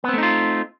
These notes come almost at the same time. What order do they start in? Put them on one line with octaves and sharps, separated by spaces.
B3 C4 A3 D#4 F4